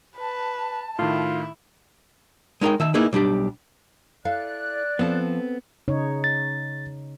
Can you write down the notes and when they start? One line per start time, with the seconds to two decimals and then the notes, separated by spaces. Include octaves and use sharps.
0.16 B4 A5
0.99 A2 D#3 E4 F4
2.61 G#3 D#4 A#4 C#5 G5
2.80 D#3 E5 A5
2.94 A#3 D#4 E4 G#4 B4
3.13 B1 G3 D4 G4
4.25 E4 A4 D5 F5 F#6
4.99 F3 B3 C4 A4
5.88 C#3 D#4 C#5
6.24 A6